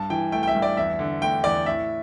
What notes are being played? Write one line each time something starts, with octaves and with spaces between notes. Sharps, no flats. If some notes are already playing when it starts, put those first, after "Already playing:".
Already playing: G2 A5
E3 G5
A3 G5
G5
E5
G2
D5
E2 E5
D3
A3 G5
E2 D5
A2 E5